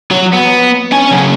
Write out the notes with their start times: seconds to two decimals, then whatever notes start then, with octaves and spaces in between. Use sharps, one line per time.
0.11 F#3
0.33 B3
0.92 C#4 G#5
1.11 C#3 F#3